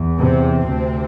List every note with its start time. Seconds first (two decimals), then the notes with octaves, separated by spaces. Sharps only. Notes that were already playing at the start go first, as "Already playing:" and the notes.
Already playing: E2
0.20 C3 C4
0.66 D2 C3